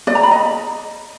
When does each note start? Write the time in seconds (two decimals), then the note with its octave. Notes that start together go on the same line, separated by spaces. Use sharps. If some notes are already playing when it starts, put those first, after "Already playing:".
0.07 D5
0.15 A#5
0.23 B5
0.31 D#5